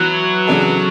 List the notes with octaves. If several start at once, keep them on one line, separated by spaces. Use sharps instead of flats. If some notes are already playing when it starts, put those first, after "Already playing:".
Already playing: E3 F#3 B3 E4 B4
C#3 E3 B3 D4 A4